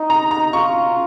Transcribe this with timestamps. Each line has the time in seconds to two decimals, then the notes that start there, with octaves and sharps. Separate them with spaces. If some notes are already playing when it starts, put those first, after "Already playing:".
Already playing: D#4
0.10 A#5
0.31 A#5
0.53 F4 C#6